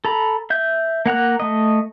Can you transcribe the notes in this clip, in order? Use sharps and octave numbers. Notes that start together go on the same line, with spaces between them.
A4 A#5 B5
E5 G6
A#3 F#5 A#5 F#6
A3 D#5